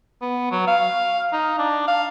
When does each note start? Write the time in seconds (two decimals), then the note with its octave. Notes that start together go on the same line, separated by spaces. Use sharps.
0.22 B3
0.51 F#3
0.67 F5
1.33 D#4
1.58 D4
1.88 F5